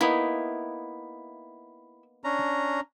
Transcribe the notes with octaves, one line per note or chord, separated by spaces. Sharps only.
A#3 B3 D#4 E4
C#4 D4 A#5